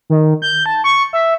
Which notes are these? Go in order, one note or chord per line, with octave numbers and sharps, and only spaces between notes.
D#3
G6
A5
C#6
E5